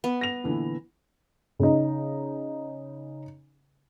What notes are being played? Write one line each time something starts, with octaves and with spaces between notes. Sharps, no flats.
B3
A#6 F7
A#2 D3 E3
C#3 D#4